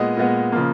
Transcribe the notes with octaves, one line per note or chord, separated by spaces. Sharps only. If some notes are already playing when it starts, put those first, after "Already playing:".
Already playing: A#2 G#3 B3 D#5
A#2 G#3 B3
C#3 F3 A#3